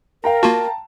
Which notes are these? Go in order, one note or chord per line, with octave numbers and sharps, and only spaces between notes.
A#4 F5 G5 A#5
A#3 F4 F#4 A5